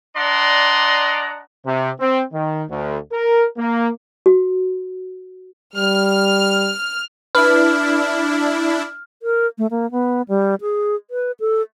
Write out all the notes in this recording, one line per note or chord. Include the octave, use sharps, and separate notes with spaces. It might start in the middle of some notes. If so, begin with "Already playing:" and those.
D4 D5 D#5 F#5 A#5 C6
C3
C4
D#3
D2
A#4
A#3
F#4
G3 F6
D4 E4 B4 F6
A#4
A3
A#3
B3
G3
G#4
B4
A4